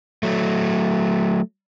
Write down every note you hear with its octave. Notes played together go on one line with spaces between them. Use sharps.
F#3 A3